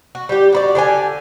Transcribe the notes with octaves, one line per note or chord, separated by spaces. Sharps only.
F#4
G3 G4
F#4 B4 D5
D3 G4 C5 G#5